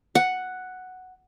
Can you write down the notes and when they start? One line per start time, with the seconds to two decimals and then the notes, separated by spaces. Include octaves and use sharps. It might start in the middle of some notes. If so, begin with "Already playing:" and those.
0.15 F#5